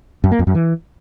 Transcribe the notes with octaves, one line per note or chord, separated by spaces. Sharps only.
F#2
A#3
F2
F#2
E3